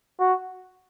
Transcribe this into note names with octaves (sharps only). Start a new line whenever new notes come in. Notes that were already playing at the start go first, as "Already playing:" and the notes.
F#4